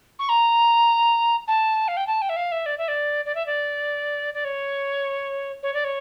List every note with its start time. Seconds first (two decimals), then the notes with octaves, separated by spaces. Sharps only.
0.19 C#6
0.29 A#5
1.48 A5
1.88 F5
1.97 G5
2.07 A5
2.22 G5
2.29 E5
2.36 F5
2.52 E5
2.66 D5
2.78 E5
2.88 D5
3.25 D5
3.35 E5
3.46 D5
4.34 D5
4.45 C#5
5.63 C#5
5.74 D5
5.84 C#5